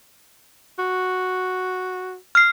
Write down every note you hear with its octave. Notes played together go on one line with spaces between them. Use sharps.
F#4
F6 C7